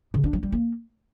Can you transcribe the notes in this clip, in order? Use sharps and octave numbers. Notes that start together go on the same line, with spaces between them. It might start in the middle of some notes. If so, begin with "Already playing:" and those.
C#3
D4
F#3
G3
A#3